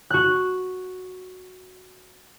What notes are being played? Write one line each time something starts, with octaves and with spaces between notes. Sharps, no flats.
F#4 F#6